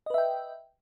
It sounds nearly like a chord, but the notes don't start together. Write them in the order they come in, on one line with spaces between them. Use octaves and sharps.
D#5 B4 E5 G5